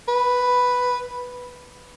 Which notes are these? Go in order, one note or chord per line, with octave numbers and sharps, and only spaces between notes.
B4